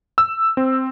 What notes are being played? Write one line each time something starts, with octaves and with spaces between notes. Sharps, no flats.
E6
C4